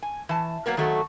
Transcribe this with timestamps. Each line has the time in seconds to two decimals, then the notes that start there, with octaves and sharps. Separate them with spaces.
0.03 G#5
0.29 E3 A5
0.66 F#3 A#3 B3 A#4
0.77 D#3 F#3 A3 F#4 A4